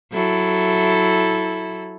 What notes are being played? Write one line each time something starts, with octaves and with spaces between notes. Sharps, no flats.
F#3 E4 A4